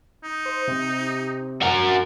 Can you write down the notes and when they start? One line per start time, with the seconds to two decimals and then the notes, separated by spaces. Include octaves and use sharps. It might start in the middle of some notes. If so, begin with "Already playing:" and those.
0.24 D#4
0.46 C5
0.68 C3
1.62 F#4 A#4